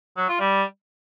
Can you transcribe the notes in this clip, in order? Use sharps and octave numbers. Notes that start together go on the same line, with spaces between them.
F#3
F4
G3